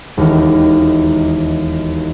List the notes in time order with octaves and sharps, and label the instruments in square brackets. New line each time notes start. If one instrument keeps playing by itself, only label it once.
[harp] E1 D#2